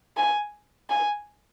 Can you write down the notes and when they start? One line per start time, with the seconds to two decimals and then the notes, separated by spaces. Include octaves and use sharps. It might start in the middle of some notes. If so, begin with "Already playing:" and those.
0.17 G#5
0.90 G#5